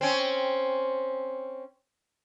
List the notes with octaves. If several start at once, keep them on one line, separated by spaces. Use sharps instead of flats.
C4 C#4